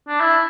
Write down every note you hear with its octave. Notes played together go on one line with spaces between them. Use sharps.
D4
E4